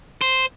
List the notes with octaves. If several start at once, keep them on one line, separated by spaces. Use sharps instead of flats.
C5